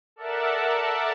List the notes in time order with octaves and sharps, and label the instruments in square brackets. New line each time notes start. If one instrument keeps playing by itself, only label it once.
[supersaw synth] A4 A#4 D5 E5 F#5 A5